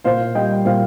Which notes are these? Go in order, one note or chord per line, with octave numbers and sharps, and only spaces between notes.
A#2 C5 F5
G3 D#5 G5
A#2 C5 F5